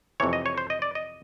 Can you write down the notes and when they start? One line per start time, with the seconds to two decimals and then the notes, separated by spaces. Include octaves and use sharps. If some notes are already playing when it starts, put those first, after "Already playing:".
0.20 F2 C3 E3 C#5
0.33 D#5
0.46 C#5
0.58 C5
0.70 D#5
0.82 D5
0.95 D#5